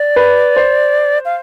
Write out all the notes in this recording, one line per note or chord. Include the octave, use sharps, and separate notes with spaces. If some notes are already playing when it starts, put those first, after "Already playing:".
Already playing: D5
B4
C5
F5